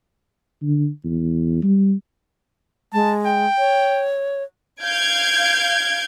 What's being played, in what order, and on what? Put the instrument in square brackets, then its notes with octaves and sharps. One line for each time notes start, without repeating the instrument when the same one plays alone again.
[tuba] D3
E2
G3
[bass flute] G#3 [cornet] A5
[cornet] G5
[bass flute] C#5
[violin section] F5 G6 G#6 D7